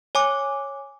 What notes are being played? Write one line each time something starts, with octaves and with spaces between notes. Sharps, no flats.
C#5 G#5 D6